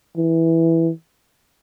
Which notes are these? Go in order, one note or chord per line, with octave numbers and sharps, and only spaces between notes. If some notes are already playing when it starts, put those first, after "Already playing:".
E3